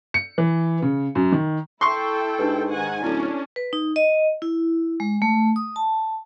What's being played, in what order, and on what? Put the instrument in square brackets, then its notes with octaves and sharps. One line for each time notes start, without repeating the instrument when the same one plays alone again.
[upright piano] C#7
E3
C#3
F#2
D#3
[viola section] E4 A4 G5 [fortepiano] C6 C#6
[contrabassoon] G#2 [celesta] D4 G4 B4
[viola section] D#3 F#5 G#5
[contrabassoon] D1 [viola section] C#4 D4 [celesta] E4 A4
[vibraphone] B4
D#4
D#5
E4
G#3
A3
D#6
A5